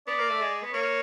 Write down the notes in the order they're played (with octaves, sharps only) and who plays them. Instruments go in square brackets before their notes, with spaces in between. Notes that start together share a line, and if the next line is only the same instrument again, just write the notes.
[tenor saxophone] B3 [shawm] D5
[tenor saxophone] A#3
A3
G#3
B3
[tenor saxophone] A#3 [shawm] C#5